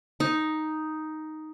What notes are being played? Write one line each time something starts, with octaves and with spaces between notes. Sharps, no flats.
D#4